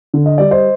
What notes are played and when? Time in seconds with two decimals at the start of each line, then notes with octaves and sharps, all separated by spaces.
0.14 D3
0.26 D#5
0.38 G3 D5
0.51 C5 D#5